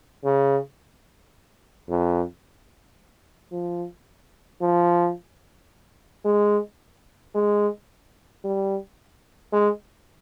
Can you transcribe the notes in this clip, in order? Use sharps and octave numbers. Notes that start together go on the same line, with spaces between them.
C#3
F2
F3
F3
G#3
G#3
G3
G#3